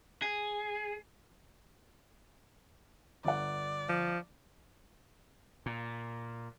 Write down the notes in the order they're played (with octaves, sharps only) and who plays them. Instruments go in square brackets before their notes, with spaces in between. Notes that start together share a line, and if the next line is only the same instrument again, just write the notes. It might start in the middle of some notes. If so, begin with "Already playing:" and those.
[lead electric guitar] G#4
[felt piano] G1 F#5 [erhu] D5
[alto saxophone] F3
[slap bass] A#2